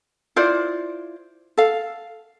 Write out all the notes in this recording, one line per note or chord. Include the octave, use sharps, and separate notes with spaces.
E4 F4 C5 D5
A4 F5